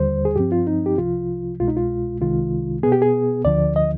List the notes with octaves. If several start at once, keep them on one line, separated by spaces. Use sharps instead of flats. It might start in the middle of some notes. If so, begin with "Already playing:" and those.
Already playing: D#2 D3 G3 C5
G#4
G2 F3 C4 G4
F4
D#4
G4
C2 C3 F3 F4
C2 B2 G#3 F4
D#4
F4
C2 C3 D#3 G#3 F4
B2 B3 G#4
G4
G#4
D2 D3 F3 D5
D#5